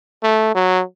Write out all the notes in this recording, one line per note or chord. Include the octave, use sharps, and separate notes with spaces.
A3
F#3